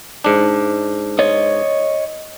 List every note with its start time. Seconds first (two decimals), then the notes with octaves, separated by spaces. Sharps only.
0.24 G#2 D4
1.19 C#5 D#5